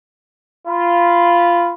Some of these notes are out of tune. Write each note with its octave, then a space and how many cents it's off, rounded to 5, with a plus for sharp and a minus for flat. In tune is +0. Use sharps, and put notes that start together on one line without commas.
F4 -10 B5 +0